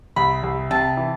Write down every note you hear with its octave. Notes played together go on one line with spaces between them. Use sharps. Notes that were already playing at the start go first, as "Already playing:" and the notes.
C2 B5
C2
C3 A5
E3